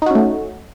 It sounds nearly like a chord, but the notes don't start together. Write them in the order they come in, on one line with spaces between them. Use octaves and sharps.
D#4 F#4 C#4 A3